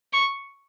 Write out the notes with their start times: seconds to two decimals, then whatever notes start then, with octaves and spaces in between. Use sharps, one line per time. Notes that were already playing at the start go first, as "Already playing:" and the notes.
0.13 C#6